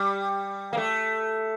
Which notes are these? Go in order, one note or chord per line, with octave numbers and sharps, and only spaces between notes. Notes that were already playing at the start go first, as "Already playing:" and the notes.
Already playing: G3
A#3
A3